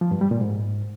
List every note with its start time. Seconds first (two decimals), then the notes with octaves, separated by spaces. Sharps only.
0.01 F3
0.11 G2
0.21 G3
0.31 A#2
0.41 G#2